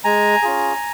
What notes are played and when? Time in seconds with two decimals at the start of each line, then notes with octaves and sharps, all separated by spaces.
0.04 G#3 G#5 A#5
0.43 C#4 F4 G#4